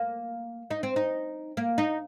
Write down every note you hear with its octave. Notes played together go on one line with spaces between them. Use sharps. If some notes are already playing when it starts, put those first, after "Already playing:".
Already playing: A#3
D#4
C4
D#4
A#3
D#4